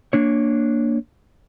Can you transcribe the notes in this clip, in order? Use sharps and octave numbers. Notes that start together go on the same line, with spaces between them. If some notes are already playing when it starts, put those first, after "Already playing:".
A#3 D4 C#5